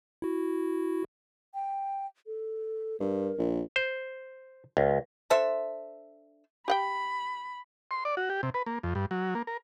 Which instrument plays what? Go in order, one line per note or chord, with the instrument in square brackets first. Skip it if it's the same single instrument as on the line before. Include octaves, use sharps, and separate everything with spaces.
[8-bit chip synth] E4 F#4
[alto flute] G5
A4
[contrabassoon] G2 [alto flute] A#4
[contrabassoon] A#1
[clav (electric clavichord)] C5
C#2
[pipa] D4 A4 C5 E5
[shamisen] G4 F#5 G5 [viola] B5
[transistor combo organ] C6
D5
F#4
G4
C3
B4
A#3
F2
G2
F#3
A#3
A#4